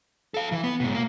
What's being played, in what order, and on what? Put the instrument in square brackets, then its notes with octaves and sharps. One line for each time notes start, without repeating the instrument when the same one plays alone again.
[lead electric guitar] A4 F5
E3
B3
G#2 B2
A#3